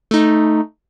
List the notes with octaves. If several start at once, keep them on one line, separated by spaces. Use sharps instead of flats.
A3 D#4